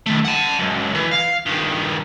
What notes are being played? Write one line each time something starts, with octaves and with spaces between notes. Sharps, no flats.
D#3 A3
F#5 A5
C#2 F#2
E3
F5
G2 D#3